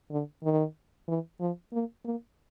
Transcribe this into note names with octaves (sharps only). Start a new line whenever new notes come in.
D3
D#3
E3
F3
A#3
A#3